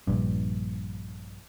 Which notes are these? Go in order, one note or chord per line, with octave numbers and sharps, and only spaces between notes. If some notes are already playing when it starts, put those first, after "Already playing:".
A#1 G2